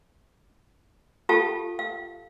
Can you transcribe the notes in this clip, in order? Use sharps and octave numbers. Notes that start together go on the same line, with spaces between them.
F4 G4 A4 F5 A5
F5